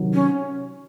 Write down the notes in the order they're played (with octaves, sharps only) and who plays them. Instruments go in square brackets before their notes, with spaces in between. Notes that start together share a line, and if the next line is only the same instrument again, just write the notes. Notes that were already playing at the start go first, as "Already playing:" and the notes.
Already playing: [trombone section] C3 D#3 F#3
[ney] C#4